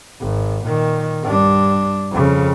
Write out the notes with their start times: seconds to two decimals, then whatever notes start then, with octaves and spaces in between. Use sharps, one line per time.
0.21 G#1
0.65 A#2 D#3
1.23 G2 D4
2.12 F2 C#3